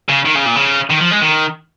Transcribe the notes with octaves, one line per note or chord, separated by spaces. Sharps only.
C#3
D#3
C#3
A#2
C#3
D#3
F3
G#3
D#3